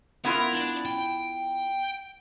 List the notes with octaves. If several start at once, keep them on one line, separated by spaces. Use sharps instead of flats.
B3 E4 F4 A#4
D4
G5